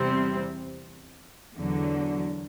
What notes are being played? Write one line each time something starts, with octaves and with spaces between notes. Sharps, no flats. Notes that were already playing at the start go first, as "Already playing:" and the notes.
Already playing: E2 C3 G3 C4
E2 D3 F#3